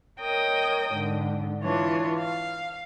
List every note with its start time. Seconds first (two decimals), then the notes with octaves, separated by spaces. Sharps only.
0.20 A#4 C#5 D#5 G5 D#6
0.92 G#2 D3
1.61 E3 D4 F4 C#5
2.18 F5